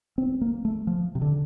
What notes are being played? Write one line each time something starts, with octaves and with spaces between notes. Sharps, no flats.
C4
A#3
A3
F3
C3
D3